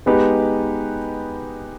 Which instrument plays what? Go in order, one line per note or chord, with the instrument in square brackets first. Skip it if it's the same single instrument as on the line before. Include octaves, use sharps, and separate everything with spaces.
[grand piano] G#3 B3 D#4 G4 B4